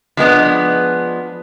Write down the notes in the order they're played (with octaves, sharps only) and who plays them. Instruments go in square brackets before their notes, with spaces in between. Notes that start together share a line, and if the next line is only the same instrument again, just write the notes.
[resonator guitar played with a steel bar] F3 G#3 B3 D4